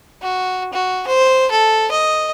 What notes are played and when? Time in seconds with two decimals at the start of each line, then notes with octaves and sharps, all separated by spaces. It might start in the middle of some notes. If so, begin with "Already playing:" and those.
0.22 F#4
0.73 F#4
1.08 C5
1.51 A4
1.91 D#5